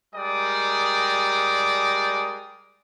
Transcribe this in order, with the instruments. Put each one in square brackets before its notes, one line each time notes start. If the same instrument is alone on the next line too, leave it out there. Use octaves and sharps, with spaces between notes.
[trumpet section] G3 G#3 A#4 D5 G5 D#6